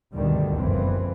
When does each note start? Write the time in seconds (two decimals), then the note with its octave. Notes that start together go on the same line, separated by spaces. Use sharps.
0.14 D2 G2 B2 D3 D#3 G3
0.57 F#1 B1 F2 E3 F3 C4